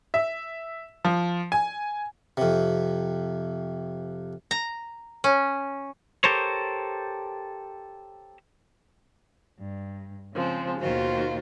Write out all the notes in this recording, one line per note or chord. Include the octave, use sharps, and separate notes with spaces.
E5
F3
G#5
F2 C3
A#5
C#4
G4 A4 A#4 C5 C#5
G2
C#3 F3 G#3 C4
D#2 B2 D#3 F4 F#4 C5